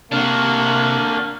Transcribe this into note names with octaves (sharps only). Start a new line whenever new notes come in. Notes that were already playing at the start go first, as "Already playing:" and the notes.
C3 A#3 D4 F#4 F6